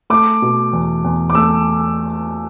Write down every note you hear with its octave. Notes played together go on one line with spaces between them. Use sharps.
A3 D6
B2
E2
E2
D6
A3 E6